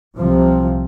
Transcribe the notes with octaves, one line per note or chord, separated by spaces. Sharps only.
C2 C3 F3